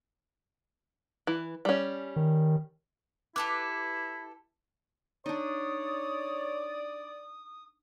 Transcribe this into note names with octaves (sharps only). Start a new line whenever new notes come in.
E3
G3 C#4
D#3
E4 G4 A4 B4 D6
D4 D#4 C#5 D5 D#6